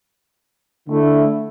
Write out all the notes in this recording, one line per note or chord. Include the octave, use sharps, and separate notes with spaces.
D3 A3 E4